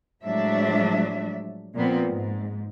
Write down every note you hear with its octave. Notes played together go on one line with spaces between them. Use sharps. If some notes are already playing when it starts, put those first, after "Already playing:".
A2 F3 F#3 G#3 D4 E5
A#2 F3 B3 C4
G#2